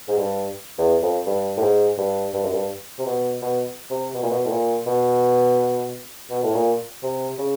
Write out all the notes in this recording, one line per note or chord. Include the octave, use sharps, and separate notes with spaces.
G#2
G2
E2
F2
G2
A2
G#2
G2
G2
F#2
G2
C3
B2
B2
C3
B2
A#2
B2
A2
A#2
B2
B2
A2
A#2
C3
C#3